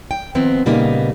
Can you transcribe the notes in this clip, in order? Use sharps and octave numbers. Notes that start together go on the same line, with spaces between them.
G5
D#3 F3 B3 C4
A#2 C#3 G3 A#3 B3 D#4